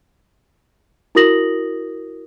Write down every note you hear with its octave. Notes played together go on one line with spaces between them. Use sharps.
E4 F#4 A#4 D#6 A#6 F#7